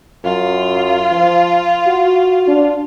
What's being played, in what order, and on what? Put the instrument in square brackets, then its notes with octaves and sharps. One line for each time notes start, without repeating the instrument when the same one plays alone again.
[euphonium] F#2 [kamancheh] F4
[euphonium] F3
F#4
D4